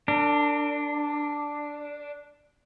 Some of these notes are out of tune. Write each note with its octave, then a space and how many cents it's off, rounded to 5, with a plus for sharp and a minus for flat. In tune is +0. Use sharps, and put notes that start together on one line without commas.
D4 +0 A#4 -40